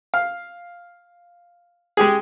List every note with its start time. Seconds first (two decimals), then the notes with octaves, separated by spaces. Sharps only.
0.14 F5
1.97 G#3 G4 G#4